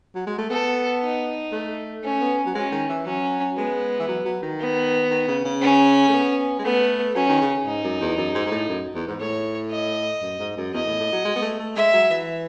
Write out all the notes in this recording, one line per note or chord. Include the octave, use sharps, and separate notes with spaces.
F#3
G#3
A3
B3 A4
D#4
A3
A3 C#4
B3
F#3
G#3 C#4
D#3
E3
F#3 C#4
G#3 B3
E3
F#3
F#3
D#3
B3
D#3
C#3
C#3
C#4
A3
B3
G#3
A3 B3
F#3 C#4
D#3
C#3
G#2 D#4
F#2
E2
F#2
G#2
G#2
A2
F#2
E2
G#2
A2 C#5
D#5
F#2
G#2
F#2
E2 D#5
A2
A2
F#3
G#3
B3
A3
A3
G#3 E5
F#3
E3